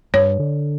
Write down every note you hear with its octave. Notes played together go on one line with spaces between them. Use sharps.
G2 C#5
D3